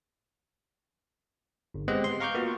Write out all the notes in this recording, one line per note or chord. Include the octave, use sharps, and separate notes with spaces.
G1
G#3 B3 C4 G4 D#5 F#6
C6
F5 A#5 C#6 D6 F6 G6
A#3 B3 F4 F#4